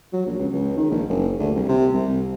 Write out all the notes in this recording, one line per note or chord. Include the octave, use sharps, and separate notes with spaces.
F#3
A#1
C#2
C#2
D#3
A#1
F#1
D2
C2
C3
C2